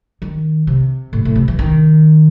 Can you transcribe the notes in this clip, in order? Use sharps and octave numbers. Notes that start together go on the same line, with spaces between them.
D#3
C3
A2
A2
C3
E3
D#3